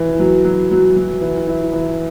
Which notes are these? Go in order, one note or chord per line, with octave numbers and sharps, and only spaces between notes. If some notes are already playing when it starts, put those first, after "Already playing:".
Already playing: E3
F#3
F#3
F#3
F#3
E3
E4
E3